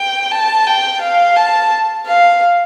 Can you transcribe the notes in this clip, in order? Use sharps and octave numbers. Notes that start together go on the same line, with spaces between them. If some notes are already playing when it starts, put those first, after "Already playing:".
Already playing: G5
A5
G5
F5
A5
F5